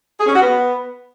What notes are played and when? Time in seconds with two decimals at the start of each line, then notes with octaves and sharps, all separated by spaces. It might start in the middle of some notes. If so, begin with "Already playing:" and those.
0.19 G#4
0.26 C#4
0.34 F#4
0.42 B3